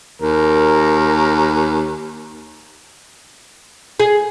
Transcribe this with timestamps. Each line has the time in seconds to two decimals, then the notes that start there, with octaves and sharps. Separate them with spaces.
0.22 D#2 A#4
4.00 G#4